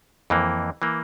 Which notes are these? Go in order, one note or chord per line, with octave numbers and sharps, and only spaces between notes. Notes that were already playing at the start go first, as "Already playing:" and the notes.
F2 E3 A#3
E3 A#3